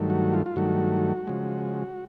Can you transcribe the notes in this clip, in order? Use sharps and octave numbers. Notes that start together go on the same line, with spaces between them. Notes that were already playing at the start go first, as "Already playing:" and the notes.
Already playing: G2 D#3 F#3 A3
F#4
F4
F4
G2 D#3 F#3 A3 F#4
C#3 F3 G#3